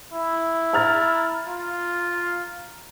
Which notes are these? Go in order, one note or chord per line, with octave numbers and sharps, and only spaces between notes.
E4
A#5 F6 A6
F4